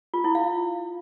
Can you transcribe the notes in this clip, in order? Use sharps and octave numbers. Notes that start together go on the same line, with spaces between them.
F4
E4
F5